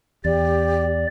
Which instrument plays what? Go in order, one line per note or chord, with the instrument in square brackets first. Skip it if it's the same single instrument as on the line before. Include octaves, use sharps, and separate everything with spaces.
[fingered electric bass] E2 [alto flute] G4 [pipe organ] D5